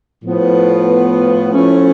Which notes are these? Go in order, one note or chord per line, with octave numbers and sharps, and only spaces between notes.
A2 F3 B3
A2 F3 A3 C#4